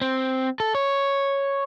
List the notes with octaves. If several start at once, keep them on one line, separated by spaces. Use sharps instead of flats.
C4
A4
C#5